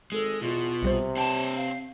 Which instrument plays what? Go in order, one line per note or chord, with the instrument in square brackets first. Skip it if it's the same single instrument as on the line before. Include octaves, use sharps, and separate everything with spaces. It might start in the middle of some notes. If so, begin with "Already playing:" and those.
[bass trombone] G#1 [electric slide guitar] G#3 [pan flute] A4
[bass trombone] E2 [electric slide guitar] B2 [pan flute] F4
[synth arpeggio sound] B1 G3 C5 [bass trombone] C3
[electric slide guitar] C4 C#5 G5 [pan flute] A5
[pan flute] F5